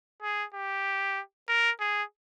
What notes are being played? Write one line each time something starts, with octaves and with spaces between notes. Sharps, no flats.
G#4
G4
A#4
G#4